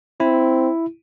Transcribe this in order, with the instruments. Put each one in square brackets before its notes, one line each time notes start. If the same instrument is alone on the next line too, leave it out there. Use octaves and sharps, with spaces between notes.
[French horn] C4 [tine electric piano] E4